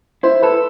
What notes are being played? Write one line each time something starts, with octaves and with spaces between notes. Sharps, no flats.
E4 C5
A4 B4